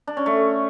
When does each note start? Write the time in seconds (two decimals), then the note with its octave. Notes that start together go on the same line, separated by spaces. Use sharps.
0.07 D4
0.17 C#4
0.26 A3